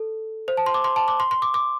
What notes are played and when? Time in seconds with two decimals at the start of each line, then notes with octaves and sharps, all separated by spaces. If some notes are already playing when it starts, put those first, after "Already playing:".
Already playing: A4
0.48 C5
0.57 A5
0.66 C6
0.74 D6
0.84 C6
0.96 A5
1.08 D6
1.20 C6
1.31 C6
1.42 D6
1.54 D6